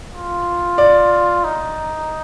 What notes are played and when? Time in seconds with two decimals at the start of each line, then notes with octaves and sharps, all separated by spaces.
0.12 F4
0.78 D5
1.44 D#4